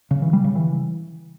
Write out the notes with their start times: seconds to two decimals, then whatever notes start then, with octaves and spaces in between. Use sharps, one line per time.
0.11 C#3
0.22 E3
0.33 G3
0.44 C#3
0.56 E3